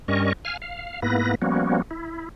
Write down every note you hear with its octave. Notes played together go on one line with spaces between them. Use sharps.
G2 G3 C#4 A#4 D#5 C#6
F5 G#5 F6
F5
G#2 A#3 B3 E4 B4 A#6
F3 G3 A#3 B3 C#4 F#4
E4